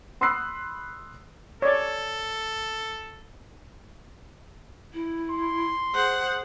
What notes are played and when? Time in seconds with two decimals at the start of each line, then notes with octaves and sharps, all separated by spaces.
0.21 B5 C6 D#6 E6 F#6 C7
1.62 A4 C#5 D5
4.93 E4
5.31 C6
5.95 G#4 C5 F#5